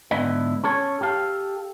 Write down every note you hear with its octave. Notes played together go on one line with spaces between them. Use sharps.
G#2 D3 B3 E4 D5 D#5
C#4 A4 C#5
G4 A4 F5